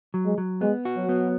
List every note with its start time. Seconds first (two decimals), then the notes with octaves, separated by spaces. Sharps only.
0.14 F#3
0.25 G#3
0.38 F#3
0.61 G#3 B3
0.85 F#4
0.97 F#3
1.09 B3